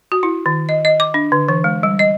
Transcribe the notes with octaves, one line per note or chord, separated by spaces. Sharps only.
F#4
E4
D#3
D#5
D#5
D6
D4
D3
E3
G#3
G3
D#5